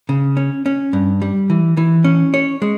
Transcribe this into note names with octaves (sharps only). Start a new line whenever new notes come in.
C#3
C#4
C#4
G2
G3
E3
E3
C#4
C#5
G#3